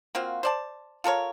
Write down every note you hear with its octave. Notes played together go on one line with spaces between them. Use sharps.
A#3 C4 F4 F#4
C5 D5 A5
F4 A4 A#4 C#5